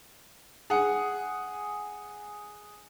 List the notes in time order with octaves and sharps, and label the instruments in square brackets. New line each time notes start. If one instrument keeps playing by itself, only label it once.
[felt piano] G#4 F#5